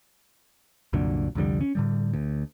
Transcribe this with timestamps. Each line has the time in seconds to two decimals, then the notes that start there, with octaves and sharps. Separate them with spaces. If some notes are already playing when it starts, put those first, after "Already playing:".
0.93 C2 F#2 A#2 D3
1.35 C2 F2 D3 G3
1.61 C#4
1.75 A2 D3 G3
2.13 D2